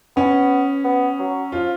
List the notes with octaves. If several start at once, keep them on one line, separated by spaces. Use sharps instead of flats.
B3 C#4
B3
F#3
F3 F4